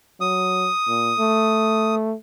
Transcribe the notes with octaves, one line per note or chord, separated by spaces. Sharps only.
F#3 D#6
A#2
A3